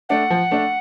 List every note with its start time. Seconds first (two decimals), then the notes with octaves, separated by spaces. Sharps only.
0.09 A3 D4 F#5
0.30 F3
0.51 A3 D4